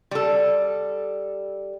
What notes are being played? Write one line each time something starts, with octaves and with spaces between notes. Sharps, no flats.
G3 A4